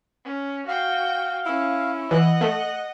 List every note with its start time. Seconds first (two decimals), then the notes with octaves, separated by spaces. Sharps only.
0.24 C#4
0.67 F#4 F5 G5
1.46 C#4 E4
2.11 E3 D#5 F#5 F#6
2.41 A3